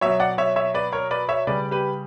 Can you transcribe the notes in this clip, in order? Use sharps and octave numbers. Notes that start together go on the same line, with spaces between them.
B2 F#3 C#5 E5
D5 F#5
C#5 E5
C#5 E5
B4 D5
A#4 C#5
B4 D5
C#5 E5
C#3 G3 B4 D5
G4 B4